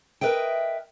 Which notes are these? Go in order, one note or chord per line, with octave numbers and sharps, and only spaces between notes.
A#4 B4 D#5 E5 G5